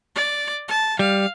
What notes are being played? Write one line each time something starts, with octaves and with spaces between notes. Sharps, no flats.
D5
A5
G3 F5